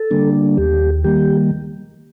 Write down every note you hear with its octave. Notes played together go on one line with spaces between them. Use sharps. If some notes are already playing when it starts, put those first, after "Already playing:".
Already playing: A4
D3 G3 A#3 D4
D#2 G4
D#3 G3 A#3 G4